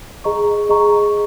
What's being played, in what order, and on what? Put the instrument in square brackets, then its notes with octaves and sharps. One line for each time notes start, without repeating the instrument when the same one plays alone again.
[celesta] G#4 D#5 A#5 C#6
G#4 D#5 A#5 C#6